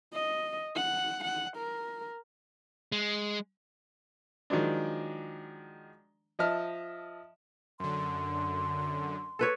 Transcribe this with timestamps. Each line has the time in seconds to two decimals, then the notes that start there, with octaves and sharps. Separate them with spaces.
0.13 D#5
0.76 F#5
1.24 F#5
1.57 A#4
2.92 G#3
4.50 D#3 F3 F#3 G#3 D4
6.39 F3 D#5 E5 A5 F6
7.80 F#2 D3 C6
9.39 A4 B4 C#5